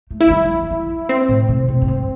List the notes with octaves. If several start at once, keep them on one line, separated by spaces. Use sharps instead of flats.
A3
E4
A3
G3
F#3
E3
F#3
C4
A2
C3
B2
A2
G2